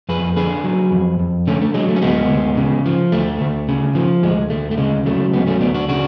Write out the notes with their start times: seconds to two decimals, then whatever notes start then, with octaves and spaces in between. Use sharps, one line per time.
0.09 F2 G#4 B4
0.36 D3 G#4 B4
0.64 F#3
0.91 F2
1.20 F2
1.47 D3 A3 C#4
1.62 A3
1.74 F#3 G#3
1.89 A3
1.96 C#4
2.02 D2 G#3 B3
2.30 D2
2.57 C#3
2.86 F3
3.12 D2 A3
3.41 D2
3.68 C#3
3.95 F3
4.23 D2 G#3
4.50 D2 A3
4.71 A3
4.78 C#3 G#3
5.06 F#3 A3
5.33 D2 G#3 B3
5.47 A3 C#4
5.61 D2 B3 D4
5.74 D4 F#4
5.89 C#3 D4 F#4